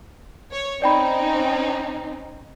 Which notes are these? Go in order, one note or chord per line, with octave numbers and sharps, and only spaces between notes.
C#5
C4 C#4 D#4 D5 G5 B5